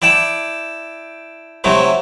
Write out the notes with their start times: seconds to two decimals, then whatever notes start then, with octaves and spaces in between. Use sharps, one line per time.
0.02 E4 D5 G5 A5
1.64 C3 F#3 A3 E4